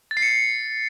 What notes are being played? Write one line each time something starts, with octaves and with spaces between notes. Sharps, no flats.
A6
C7
C#7